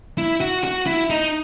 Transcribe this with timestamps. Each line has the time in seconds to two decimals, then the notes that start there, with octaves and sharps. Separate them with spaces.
0.18 E4
0.41 F#4
0.64 F#4
0.86 E4
1.10 D#4